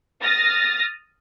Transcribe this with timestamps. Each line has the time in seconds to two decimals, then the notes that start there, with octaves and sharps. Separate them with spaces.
0.22 D#6 F6 A6 A#6